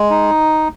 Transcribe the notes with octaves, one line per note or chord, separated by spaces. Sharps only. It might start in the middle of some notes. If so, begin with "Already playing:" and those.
Already playing: G#3
D#4